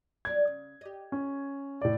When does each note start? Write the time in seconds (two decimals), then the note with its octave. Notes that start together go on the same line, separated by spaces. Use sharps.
0.25 F#3 D4 D5 G#6
0.47 C#3
0.81 G4 D#5
1.12 C#4
1.82 A2 D5